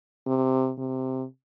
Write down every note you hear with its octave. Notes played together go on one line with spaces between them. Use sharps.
C3
C3